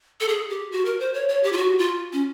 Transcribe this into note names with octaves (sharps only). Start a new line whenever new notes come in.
A4
G#4
G4
F#4
A#4
C5
C#5
C#5
G4
F4
F#4
F4
C#4